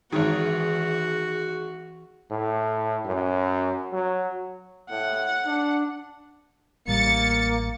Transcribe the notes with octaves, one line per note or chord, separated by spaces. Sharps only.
G#1 D#3 E3 F#4 G#4
A2
F#2
F#3
A2 F#5
D4
A1 A2 G3 A#3 A6 C#7